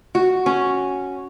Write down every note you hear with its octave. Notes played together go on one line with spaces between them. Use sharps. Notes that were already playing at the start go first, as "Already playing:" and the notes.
F#4
C#4